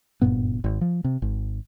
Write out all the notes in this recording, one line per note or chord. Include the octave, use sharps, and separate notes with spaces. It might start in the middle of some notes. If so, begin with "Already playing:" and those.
F#1 G2 A#2 B3
G#1
F3
C3
G#1